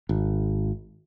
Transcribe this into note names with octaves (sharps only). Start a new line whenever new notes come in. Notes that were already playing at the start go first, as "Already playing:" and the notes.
G#1